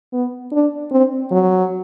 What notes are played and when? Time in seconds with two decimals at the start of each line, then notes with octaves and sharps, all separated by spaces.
0.13 B3
0.52 D4
0.91 C4
1.31 F#3